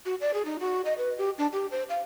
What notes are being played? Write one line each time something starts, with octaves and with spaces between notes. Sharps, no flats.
F#4
D5
G#4
D#4
F#4
D#5
B4
G4
D4
G4
C5
F5